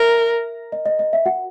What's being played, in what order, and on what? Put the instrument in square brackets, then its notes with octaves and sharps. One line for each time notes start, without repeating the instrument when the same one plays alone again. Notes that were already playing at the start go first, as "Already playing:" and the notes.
Already playing: [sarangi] A#4 [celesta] E5
[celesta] D#5
D#5
D#5
E5
F#4 F#5